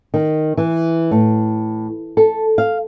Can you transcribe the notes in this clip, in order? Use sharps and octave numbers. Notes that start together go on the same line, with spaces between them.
D#3
E3
A2
A4
F5